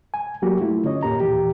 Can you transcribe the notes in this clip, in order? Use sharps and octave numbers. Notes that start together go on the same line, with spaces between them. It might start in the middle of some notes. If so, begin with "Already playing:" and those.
G#5
F#3 A#3 F#4 G4
A3 E4 F4
D3 C#4 C#5 D#5
E2 A2 A#3 G4 A#5
D#2 A#2 E3 G4